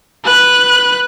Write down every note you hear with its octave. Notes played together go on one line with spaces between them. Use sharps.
B4 F#6